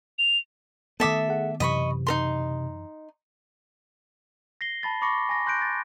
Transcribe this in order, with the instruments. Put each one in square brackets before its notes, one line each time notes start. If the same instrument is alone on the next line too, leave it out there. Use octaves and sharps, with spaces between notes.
[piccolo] F7
[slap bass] D#3 A3 B3 [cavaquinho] A4 E5 D6 [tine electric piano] D#6
[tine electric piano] G#4 F#5
[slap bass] F#2 E3 [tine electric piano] C3 [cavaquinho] D#5 B5 C#6
[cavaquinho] D#4 A#4 C6
[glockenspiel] A#6 C7 G7
A5 B5 A6
B5 C#6 D6 A#6 C#7
G#5 A#6
C6 F#6 G6 A#6 D7
A6